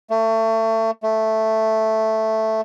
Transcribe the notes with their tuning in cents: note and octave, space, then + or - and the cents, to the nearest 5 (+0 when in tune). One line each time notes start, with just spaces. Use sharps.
A3 +30
A3 +0